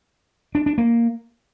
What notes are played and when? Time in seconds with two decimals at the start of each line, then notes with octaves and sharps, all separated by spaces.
0.55 D4
0.66 D4
0.78 A#3